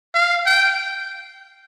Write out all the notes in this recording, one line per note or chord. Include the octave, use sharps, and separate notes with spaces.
F5
G5